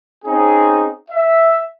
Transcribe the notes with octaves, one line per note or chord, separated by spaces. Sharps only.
C4 C#4 D#4 G#4
E5